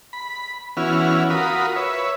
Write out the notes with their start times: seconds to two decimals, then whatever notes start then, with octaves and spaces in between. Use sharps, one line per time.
0.13 B5
0.77 E3 B3 C#4 E4 F#4 F6
1.30 F4 F#4 A#4 B5 D#6
1.76 B4 C#5 E5